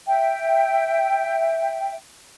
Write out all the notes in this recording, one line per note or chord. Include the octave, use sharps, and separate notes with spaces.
E5 G5